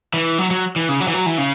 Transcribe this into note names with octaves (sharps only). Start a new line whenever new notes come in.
E3
F#3
F#3
E3
C#3
F#3
E3
F#3
E3
C#3